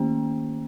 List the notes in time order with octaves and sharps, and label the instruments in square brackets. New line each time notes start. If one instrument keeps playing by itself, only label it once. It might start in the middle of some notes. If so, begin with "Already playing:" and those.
Already playing: [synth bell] D#3 A#3 C#4